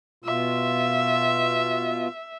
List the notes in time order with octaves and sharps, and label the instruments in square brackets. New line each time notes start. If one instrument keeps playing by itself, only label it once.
[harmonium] B2 F4 [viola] E5